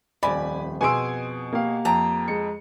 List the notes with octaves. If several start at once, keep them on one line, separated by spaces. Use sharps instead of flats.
D#1 F2 D5 G#5 B5
B2 G#4 G#5 C6 E6 D7
A#3 G4 F5
F2 G5 A5 A#5
G#3 C#7